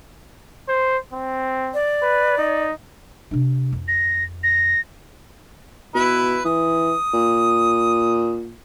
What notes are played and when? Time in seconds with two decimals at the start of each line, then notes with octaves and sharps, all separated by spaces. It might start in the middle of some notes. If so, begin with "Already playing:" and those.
0.69 C5
1.13 C4
1.74 D5
2.02 B4
2.38 D#4
3.31 C3 D4
3.73 F2
3.88 A#6
4.43 A#6
5.95 B2 E4 B4
6.45 E3 D#6
7.14 A#2